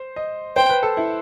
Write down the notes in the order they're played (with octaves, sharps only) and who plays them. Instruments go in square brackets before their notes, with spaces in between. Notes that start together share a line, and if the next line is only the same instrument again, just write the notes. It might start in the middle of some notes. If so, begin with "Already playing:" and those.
Already playing: [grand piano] C5
D#5
[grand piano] C5 [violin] G5
[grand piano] B4
A4
E4